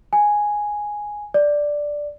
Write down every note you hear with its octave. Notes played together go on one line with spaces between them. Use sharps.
G#5
D5